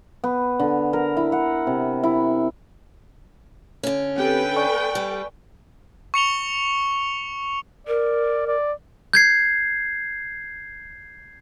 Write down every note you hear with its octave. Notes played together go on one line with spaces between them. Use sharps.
B3
D3
A#4
E4
F#5
C3
E4
D3 C#4
C4 G4 A4 B4 G5
D5 G#5 C#6
G3
C#6 C#7 F7 G7
A#4 D5
D5
G6 G#6 C7